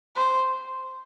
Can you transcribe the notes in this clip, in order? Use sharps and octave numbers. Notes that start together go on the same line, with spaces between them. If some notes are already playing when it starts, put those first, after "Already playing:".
C5